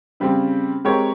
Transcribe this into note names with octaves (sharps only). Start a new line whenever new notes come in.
C#3 G3 C4
G#3 C4 G4 A#4 C#5